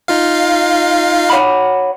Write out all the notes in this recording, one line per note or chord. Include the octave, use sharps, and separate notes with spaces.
D#4 F4 F5
C#5 F#5 B5